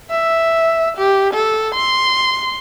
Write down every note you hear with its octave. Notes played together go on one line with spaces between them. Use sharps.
E5
G4
A4
C6